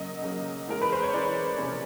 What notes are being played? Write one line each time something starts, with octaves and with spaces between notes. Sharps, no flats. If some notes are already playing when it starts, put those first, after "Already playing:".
Already playing: C#3 F#3 A#3 D#5
C#3 F#3 A#3
E3 G#3 C#4 A#4
B4
C5
C#5
E3 G#3 C#4 D5
C3 F3 A#3 C#4